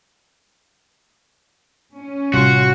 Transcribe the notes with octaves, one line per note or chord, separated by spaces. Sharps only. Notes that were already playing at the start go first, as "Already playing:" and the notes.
C#4
A1 C3 G3 F4 F#4 C#6